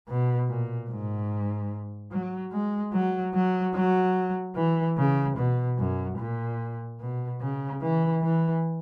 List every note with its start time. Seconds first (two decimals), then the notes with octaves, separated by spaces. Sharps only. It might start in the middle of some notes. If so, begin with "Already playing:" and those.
0.08 B2
0.49 A#2
0.90 G#2
2.12 F#3
2.52 G#3
2.93 F#3
3.34 F#3
3.75 F#3
4.55 E3
4.97 C#3
5.37 B2
5.78 F#2
6.18 A#2
7.00 B2
7.41 C#3
7.82 E3
8.22 E3